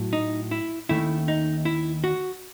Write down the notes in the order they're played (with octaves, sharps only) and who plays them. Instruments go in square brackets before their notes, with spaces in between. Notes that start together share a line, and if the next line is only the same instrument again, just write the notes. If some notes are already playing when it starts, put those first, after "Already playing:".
Already playing: [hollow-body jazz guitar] A2 F#3
D#4
E4
D#2 D#3 A3 C#4 E4
D#4
E4
F#4